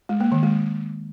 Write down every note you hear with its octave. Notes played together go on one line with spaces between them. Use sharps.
G#3
A#3
D#3
G#3